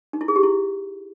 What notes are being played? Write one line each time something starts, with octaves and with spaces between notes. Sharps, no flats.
D#4
E4
G#4
G4
E4